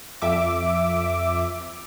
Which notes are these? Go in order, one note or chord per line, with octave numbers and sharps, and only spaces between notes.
F2 E5 D6